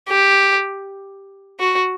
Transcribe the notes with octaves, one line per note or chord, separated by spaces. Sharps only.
G4
F#4